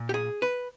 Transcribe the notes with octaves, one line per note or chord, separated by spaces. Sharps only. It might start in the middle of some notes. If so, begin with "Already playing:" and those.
Already playing: A#2
G4
G#4
B4